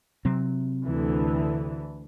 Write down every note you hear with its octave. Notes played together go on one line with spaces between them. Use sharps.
C3 F#3 C4
D2 D3 E3